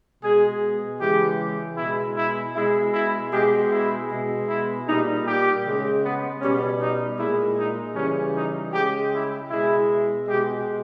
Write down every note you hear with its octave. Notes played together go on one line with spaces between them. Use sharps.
B2 G#3 G#4
C#3 E3 G#3 G4
B2 G#3 E4
E4
B2 G#3 E4
E4
B2 G#3 G4
E4
B2 G#3
E4
A#2 G3 D#4
G4
C#3 G#3
B3
B2 G3 C#4
D#4
A#2 G#3 E4
D#4
C#3 E3 G3 C#4
D#4
C#3 G#3 G4
E4
B2 G#3 E4
B2 G#3 G4